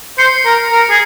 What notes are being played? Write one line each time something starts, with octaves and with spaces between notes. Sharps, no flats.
C5 C#7
A#4
A#4
G#4